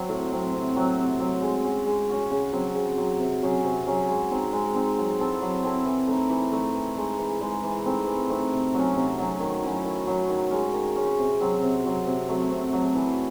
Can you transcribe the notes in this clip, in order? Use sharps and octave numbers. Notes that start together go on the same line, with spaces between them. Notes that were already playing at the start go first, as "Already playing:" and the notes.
Already playing: F#3 C4 F#4
A2
F#3 C4
C3
F#3 C4
C3
F#3 C4
G#3
C#4 F#4
G#3
C#4 F#4
C#3
F#3 C4
C#3
F#3 C4
C3
F#3 C#4 G#4
C3
F#3 C#4 G#4
G#3
C4 D#4
G#3
C4 D#4
F#3
C4 E4 A4
F#3
C4 E4 A4
E3
A3 D#4
E3
A3 D#4
E3
G#3 D#4
E3
G#3 D#4
E3
A3 C4 D#4
E3
A3 C4 D#4
C3
F#3 C#4
C3
F#3 C#4
D#3
F#3 C#4 E4
D#3
F#3 C#4 E4
D#3
G#3 C#4
D#3
G#3 C#4
C3
F#3 C4
C3
F#3 C4
C3
F#3 A3
C3
F#3 A3
E3